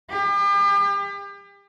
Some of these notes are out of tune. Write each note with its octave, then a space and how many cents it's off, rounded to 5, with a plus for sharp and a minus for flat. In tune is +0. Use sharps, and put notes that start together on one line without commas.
G4 +40